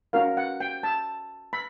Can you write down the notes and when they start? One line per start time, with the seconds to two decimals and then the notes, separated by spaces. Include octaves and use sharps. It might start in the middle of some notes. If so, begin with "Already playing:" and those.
0.13 C#4 F#4 A#4 F5
0.37 F#5
0.60 G5
0.83 A5
1.53 B5